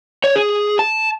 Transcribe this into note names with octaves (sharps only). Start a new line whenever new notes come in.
C#5
G#4
A5